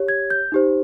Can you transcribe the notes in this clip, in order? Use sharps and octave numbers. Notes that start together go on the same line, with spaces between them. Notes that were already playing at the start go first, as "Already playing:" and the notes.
Already playing: G4 C#5
G#6
G6
D#4 G4 C5